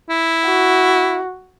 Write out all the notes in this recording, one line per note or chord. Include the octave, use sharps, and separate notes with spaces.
E4
F#4